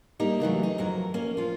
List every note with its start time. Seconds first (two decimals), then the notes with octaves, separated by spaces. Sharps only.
0.19 G3 A#3 D#4 E4 G4
0.40 C#3 E3 F#3 A3
0.63 D#4
0.78 F2 F#3 A#4
1.14 A#3 C#4
1.37 F3 F4